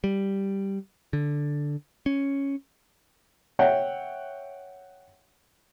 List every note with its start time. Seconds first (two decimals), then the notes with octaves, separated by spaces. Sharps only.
0.04 G3
1.13 D3
2.06 C#4
3.59 C#5 E5 F#5 G5